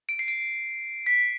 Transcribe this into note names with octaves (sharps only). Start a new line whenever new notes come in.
D7
C7
D7
B6